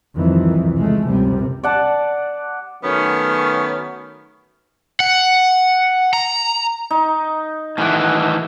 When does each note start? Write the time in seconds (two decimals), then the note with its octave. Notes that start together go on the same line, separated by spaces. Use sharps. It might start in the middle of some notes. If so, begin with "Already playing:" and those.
0.16 C2 F2 D#3 E3
0.77 C#2 C#3 G#3 A3
1.08 C#2 F#2 C3 G3
1.64 D5 F#5 A5
2.83 D#3 F#3 A3 B3 C#4
5.00 F#5
6.13 A#5
6.90 D#4
7.78 A2 D#3 E3 F#5 G#5